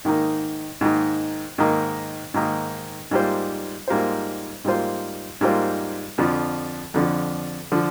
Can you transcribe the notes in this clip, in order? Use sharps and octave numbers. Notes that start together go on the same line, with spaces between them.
G#2 D#3 A#3 D#4
G#2 D#3 A#3 D#4
G#2 D#3 A#3 D#4
G#2 D#3 A#3 D#4
G#2 G3 A#3 F4 C5
G#2 G3 A#3 F4 C5
G#2 G3 A#3 F4 C5
G#2 G3 A#3 F4 C5
F2 D3 F3
F2 D3 F3
D3 F3